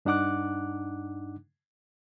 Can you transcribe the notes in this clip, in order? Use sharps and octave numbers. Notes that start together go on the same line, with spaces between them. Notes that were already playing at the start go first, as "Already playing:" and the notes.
G2 D4 D#4 F#5 D6 F#6